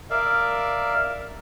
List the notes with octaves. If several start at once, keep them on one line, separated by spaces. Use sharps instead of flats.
A#4 D5 E5 F5